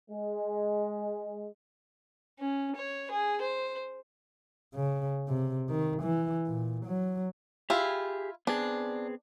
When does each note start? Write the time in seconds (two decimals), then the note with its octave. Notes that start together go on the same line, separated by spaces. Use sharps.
0.10 G#3
2.40 C#4
2.76 C#5
3.11 G#4
3.41 C5
4.75 C#3
5.28 C3
5.70 D#3
6.02 E3
6.47 A#2
6.85 F#3
7.70 E4 F4 G4 G#4
8.47 B3 C4 D4 G#4